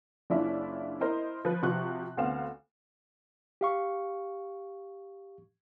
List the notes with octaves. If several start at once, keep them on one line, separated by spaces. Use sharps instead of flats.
F#1 C#4 D4 E4 F4 E5
E4 A#4 C5 D#5
F3 F4 B4
C3 F3 F4 F#4 C#6 F#6
D2 B3 C4 F5 F#5 E7
G4 F5 C#6